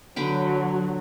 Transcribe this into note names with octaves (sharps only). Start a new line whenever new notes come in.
D3 F#3 B4 G5